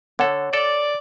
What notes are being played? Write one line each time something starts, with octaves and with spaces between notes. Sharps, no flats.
D3 A4 C#5 F#5
A4 D5